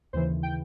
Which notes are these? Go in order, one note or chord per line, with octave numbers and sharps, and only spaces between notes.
D#2 C#3 E3 C5
G5